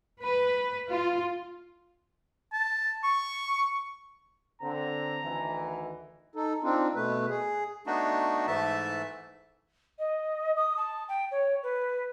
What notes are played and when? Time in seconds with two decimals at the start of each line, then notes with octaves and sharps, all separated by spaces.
0.20 B4
0.89 F4
2.53 A5
3.04 C#6
4.61 D3 C4 A#5
5.24 D2 D#3 E3
6.35 D#4 A4
6.63 C4 D4 D#4 F4
6.95 B2 A3 B4
7.29 G#4
7.87 A3 B3 D4 D#4 F#4
8.47 G#2 E3 A3 E5 A5
9.99 D#5
10.56 D#6
10.77 A5
11.08 G5
11.31 C#5
11.63 B4